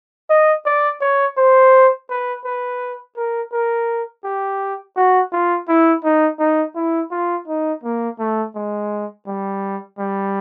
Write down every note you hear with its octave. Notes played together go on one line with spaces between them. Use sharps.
D#5
D5
C#5
C5
B4
B4
A#4
A#4
G4
F#4
F4
E4
D#4
D#4
E4
F4
D#4
A#3
A3
G#3
G3
G3